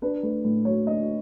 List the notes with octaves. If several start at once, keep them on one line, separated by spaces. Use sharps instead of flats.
D4 B4
A3 B4
A2
F#3 C#5
D4 D#5